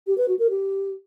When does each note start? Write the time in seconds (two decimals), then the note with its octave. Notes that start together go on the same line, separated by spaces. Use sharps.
0.07 G4
0.18 B4
0.28 F#4
0.39 A#4
0.50 G4